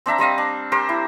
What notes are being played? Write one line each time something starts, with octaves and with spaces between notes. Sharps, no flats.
C4 D4 E5 A#5
G3 C4 D#5 F5
D4
G4 A#4 C5
E4